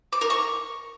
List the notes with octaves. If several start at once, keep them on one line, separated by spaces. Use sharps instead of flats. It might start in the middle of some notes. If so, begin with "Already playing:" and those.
D6
A#4
C#6